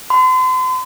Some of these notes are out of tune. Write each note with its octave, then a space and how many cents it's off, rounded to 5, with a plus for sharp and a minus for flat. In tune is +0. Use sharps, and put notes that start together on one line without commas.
C6 -40